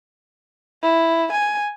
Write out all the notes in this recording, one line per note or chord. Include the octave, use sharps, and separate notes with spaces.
E4
G#5